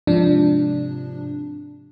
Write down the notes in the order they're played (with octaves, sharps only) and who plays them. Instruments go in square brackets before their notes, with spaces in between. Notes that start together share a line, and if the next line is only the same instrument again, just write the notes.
[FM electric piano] G#2 C3 F3 D4